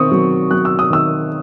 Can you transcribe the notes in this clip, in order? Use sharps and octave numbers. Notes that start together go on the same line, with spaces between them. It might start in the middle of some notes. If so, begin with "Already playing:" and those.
Already playing: D#3 C4 C#6 D#6
F#3
F#3 F#6
E6
D#6
D#3 E6